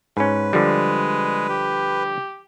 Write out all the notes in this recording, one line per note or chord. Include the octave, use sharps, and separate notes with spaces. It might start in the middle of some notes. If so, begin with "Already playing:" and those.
G#2 C#4 B4
D3 F3 G3 G#3
G4